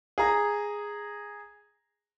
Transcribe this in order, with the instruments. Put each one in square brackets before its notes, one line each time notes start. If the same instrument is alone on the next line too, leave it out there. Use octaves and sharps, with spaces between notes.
[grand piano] G#4 A#5